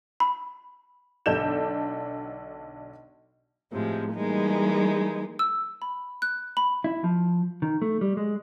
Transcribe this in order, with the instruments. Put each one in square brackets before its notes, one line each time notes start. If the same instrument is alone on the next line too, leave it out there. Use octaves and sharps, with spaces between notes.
[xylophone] B5
[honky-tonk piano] B1 D3 D4 A4 G6 E7
[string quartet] A2 C3 F3 G#3
E3 G3 G#3 A#3 D#4
[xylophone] E6
B5
F#6
B5
[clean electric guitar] E4
F3
D#3
A3
G3
G#3